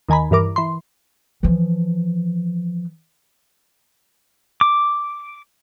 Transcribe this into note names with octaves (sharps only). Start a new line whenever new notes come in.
D#2 D#3 G#5 A#5 B5
G2 E3 A#4 D6
E3 C6
E3 F3
D6